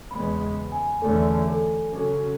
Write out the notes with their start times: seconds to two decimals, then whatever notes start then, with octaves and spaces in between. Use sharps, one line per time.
0.11 E2 C#3 G#3 B3 B5
0.72 G#5
1.02 E2 D3 A3 C#4 A4
1.48 A4
1.93 C#3 F#3 C#4 A4